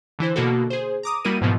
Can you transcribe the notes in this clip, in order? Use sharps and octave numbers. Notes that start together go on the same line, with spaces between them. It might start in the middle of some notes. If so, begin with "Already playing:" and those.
D3 E3 E4 C5
B2 D3 A#3 F#4 A4
G#4 C5
A#5 D6 D#6
G3 A#3 E4 F#4 A#4 D#7
G#2 B2 E3 F3 B3